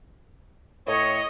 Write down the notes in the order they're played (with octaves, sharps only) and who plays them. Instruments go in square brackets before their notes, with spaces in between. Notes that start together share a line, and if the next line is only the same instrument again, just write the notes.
[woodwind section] A2 C#5 [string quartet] D#5